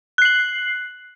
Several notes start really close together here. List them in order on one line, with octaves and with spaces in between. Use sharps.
F#6 C7 F#7